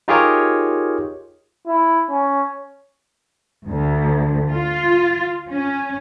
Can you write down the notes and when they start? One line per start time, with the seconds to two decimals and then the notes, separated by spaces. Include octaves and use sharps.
0.08 D#4 F4 G4 G#4 A#4 C#5
1.67 E4
2.10 C#4
3.68 D2
4.51 F4
5.50 C#4